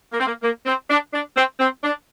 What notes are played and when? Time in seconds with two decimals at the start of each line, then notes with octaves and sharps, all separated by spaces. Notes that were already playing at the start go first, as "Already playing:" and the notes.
0.13 A#3
0.20 C4
0.27 A#3
0.43 A#3
0.66 C4
0.90 D4
1.14 D4
1.37 C4
1.60 C4
1.84 D4